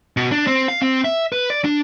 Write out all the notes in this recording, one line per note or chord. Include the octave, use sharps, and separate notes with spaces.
B2
D4
C4
F5
C4
E5
B4
D5
D4